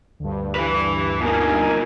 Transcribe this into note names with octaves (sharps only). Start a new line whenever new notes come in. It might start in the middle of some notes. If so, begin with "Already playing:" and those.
D2 G2
E3 B4
B2 A#3 D#4 A#4 G#5